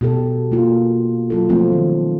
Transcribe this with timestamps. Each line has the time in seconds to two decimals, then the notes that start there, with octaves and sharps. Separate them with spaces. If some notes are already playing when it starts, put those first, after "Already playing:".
0.01 B2 G4 A4
0.52 A#3 F4
1.30 F#3 F4 A4
1.49 F3 A3 C4 F4
1.72 D#3